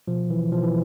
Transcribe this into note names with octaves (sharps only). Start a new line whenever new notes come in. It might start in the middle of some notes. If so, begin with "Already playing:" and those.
B2 F3
E3
B2 F3
E3